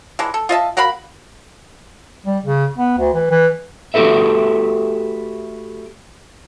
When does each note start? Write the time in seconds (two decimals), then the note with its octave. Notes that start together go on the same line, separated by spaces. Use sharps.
0.19 E3 G#3 D4
0.34 A4
0.49 F4 D#5 E5 A5
0.77 F#4 A#4 F5 B5
2.26 G3
2.44 C#3
2.78 B3
2.98 D2
3.14 E3
3.31 E3
3.94 A3 F#4 G4 A4 B4 E5